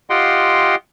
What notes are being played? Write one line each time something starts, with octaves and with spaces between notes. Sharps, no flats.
F4 G4 D#5 F#5 G5 C6